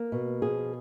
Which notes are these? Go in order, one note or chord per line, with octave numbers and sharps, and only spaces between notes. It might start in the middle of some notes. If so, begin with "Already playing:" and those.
Already playing: A#3
B2
F3 G#4